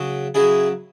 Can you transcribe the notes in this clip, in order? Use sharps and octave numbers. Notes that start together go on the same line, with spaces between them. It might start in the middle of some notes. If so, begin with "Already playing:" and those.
Already playing: C#3 F#3
C#3 F#3 E4 G#4